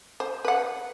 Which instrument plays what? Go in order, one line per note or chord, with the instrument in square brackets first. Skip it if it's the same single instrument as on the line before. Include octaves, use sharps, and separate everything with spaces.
[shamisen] C5
B4 F#5